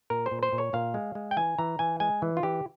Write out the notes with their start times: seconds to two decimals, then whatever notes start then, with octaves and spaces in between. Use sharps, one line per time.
0.10 A#2 A#4
0.26 C5
0.31 A#2
0.43 C5
0.52 A#2
0.58 C#5
0.73 A#2 F5
0.94 G#3
1.15 G#3
1.31 G5
1.37 E3 G#5
1.58 E3 A#5
1.79 E3 G#5
2.00 G#3 G#5
2.22 E3
2.37 F4
2.43 E3 G4